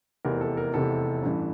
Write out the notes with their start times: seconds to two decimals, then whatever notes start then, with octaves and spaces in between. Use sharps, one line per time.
0.25 F1 E2 C3 E3 A#4
0.41 A4
0.57 A#4
0.74 F1 E2 C3 E3 A4
1.23 A1 G2 E3